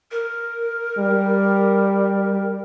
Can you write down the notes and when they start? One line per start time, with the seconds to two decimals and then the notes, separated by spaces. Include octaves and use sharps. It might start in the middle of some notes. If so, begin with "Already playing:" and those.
0.11 A#4
0.98 G3